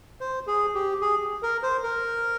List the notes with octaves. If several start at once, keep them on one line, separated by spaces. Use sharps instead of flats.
C5
G#4
G4
G#4
A#4
C5
A#4